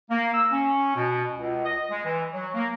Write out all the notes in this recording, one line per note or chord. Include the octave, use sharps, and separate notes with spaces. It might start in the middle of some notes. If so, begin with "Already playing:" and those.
A#3
E6
C#4
B2
C#2
D#5
G#3
E3
F#3
A#3